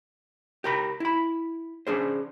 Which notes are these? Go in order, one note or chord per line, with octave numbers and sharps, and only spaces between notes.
G4 A#4 B5
E4 B5
C#4 D4 G#4 C5